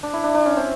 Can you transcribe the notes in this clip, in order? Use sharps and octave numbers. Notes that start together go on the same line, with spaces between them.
D4
E4
D4
D4
C#4
C4